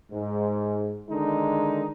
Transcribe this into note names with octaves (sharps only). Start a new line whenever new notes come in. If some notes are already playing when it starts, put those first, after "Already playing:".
G#2
D3 D#3 G#3 D#4